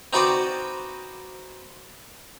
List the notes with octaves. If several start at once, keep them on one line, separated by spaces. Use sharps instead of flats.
C4 D#4 F#4 B4 C5 D5